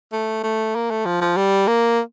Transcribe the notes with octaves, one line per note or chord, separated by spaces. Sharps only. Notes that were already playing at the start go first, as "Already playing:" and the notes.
A3
A3
A#3
A3
F3
F3
G3
A#3